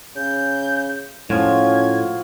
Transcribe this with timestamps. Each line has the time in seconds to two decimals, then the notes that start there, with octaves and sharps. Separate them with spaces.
0.16 C#3 G6
1.30 A2 F3 C#4 F4 F#4 G#6